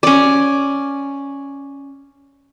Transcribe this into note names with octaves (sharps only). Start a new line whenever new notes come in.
C#4 D5